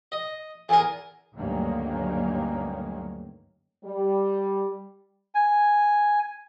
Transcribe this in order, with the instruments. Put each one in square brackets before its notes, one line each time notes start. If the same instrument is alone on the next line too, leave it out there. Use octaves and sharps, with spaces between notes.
[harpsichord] D#5
[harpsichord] E2 A#4 [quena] G#5
[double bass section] D2 G2 D#3 F#3 A#3 C#4
[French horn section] G3
[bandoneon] G#5